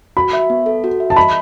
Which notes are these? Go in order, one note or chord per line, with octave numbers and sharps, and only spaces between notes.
F#4 B5
E5
B3
A4
F#4
E5
A5
D#5 B5